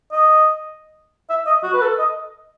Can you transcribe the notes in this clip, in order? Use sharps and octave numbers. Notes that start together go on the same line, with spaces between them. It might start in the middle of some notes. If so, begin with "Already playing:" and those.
D#5
E5
D#5
F#4
B4
A4
D#5